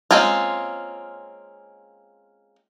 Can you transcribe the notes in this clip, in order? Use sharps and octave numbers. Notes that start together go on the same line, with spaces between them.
G#3 A#3 C4 C#4 F4